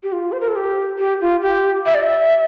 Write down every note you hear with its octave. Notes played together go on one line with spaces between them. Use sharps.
G4
F4
C5
A#4
A4
G4
G4
F4
G4
E5
D5
E5